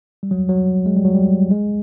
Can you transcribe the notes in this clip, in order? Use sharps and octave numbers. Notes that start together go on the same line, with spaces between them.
G3
F#3
F#3
G#3
G3
F#3
G3
G#3